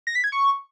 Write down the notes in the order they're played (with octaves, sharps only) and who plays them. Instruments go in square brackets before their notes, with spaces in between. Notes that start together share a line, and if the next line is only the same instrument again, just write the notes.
[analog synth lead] A#6
B6
G#6
C#6